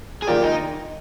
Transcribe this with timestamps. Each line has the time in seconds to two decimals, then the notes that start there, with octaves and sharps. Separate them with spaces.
0.22 G#4
0.27 D#3 A#3 F4 G4 A#4 D5
0.43 D#4